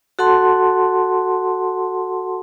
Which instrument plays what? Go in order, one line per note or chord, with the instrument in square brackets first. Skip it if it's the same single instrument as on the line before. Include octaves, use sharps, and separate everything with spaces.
[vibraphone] F#4 A4 F#5 A5 C6